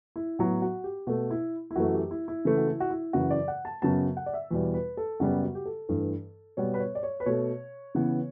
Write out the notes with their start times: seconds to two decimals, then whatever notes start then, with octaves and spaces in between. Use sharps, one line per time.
0.16 E4
0.39 A2 F#3 B3 F#4
0.62 F#4
0.84 G4
1.07 B2 A3 F#4
1.31 E4
1.71 E4
1.76 F#2 E3 A3 F#4
1.93 G4
2.11 E4
2.28 E4
2.45 C#3 E3 A3
2.57 F#4
2.67 E4
2.80 F#4
2.91 E4
3.13 F#2 C#3 E3 F#4
3.31 D5
3.48 F#5
3.65 A5
3.82 F#2 C#3 F#3 B3 A5
4.17 F#5
4.26 D5
4.34 E5
4.51 E2 B2 G3
4.74 B4
4.97 A4
5.20 F#2 C#3 G3 B3 F#4
5.43 F#4
5.55 G4
5.65 A4
5.89 G2 E3 A3
6.57 B2 G3 B3 C#5
6.74 B4
6.80 C#5
6.95 D5
7.03 C#5
7.20 B4
7.26 B2 A3 C#5
7.95 C#3 E3 B3